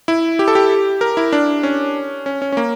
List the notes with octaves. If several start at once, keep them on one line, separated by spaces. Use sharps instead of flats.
E4
G4
A4
G4
A#4
E4
D4
C#4
C#4
C#4
C#4
A#3